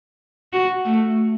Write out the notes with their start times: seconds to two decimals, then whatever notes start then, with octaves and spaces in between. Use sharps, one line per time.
0.53 F#4
0.85 A3